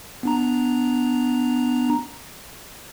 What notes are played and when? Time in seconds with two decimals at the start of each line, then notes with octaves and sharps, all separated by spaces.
0.23 B3 D4 A#5